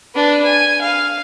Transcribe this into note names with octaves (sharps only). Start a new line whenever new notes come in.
D4 B4
G#5
F5